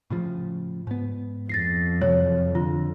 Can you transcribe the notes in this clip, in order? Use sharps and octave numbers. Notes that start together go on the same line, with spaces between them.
A2 C#3 F3
G#2 B3
F2 A6 A#6 C7
E2 C3 F#3 C#5
D3 F4